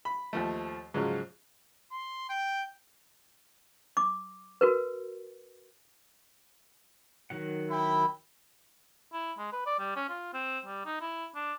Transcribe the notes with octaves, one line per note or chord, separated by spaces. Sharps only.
B5
D#2 F3 A3
G#2 C#3 F3 F#3
C6
G5
D6
F#4 A#4 B4
D#3 F#3 F#5
E4 G5 B5
E4
G#3
B4
D5
G3
C#4
F4
C4
G3
D#4
E4
D4